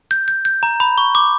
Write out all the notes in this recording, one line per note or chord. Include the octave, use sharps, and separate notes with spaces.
G6
G6
G6
A#5
B5
C#6
D6